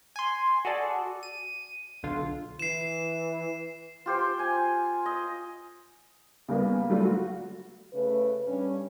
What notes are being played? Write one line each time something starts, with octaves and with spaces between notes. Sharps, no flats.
G#5 C6
F#4 G#4 A4 D5
D#7
B1 D3 F4
E3 C7 E7
F4 G4 C5
G#5
D#5
C#3 G3 A#3 B3
F#3 G3 A3 F4
F#4
C#3 A3 B4
G2 C#4